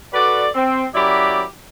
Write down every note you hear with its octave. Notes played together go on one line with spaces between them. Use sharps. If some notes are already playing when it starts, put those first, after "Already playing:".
F#4 A4 B4 D5
C4
F#2 F#3 E4 G4 D5 B5